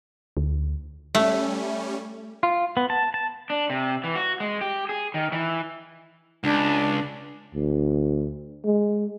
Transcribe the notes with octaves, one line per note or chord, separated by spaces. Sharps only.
D2
G3 A3 C#4
F4
B3
A5
A5
D4
C3
E3
F#4
G#3
G4
G#4
D#3
E3
C#2 D4
D2
G#3